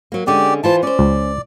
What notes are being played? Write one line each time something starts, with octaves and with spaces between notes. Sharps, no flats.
F#3 A#3
D3 G#3 C#4 G4 D5
E3 F4 C5 A5
C#4 C5 D5
C#2